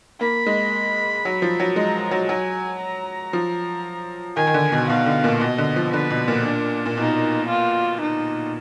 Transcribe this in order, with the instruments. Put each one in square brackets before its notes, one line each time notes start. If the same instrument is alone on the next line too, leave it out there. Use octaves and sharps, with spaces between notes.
[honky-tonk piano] A#3 [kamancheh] B5
[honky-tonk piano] G#3
F#3
F3
F#3
[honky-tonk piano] G#3 [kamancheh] A#5
[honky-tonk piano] F#3
[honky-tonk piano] F#3 [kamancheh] G#5
[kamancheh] A#5
[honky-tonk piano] F3
[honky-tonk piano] D#3 [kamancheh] G#5
[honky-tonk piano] D#3
D3
B2
[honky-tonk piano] B2 [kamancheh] F5
[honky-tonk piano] D3
A#2
[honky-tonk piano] B2 [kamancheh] D#5
[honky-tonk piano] D3
F3
[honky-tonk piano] D3 [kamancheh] B4
[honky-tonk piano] B2
A#2
[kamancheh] D4
[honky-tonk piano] A#2
[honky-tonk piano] B2 [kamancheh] D#4
[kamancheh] F4
D#4